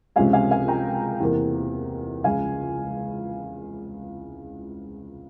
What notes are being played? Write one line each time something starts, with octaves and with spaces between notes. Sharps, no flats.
C#2 C3 F3 G#3 C#4 F5 G#5
F5 G#5
F5 G#5
G5 A#5
E2 C3 E3 A#3
C#2 C#3 F3 F5 G#5